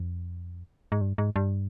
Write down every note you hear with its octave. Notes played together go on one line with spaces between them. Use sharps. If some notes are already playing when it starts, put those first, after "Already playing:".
Already playing: F2
G#2
G2
G#2
G2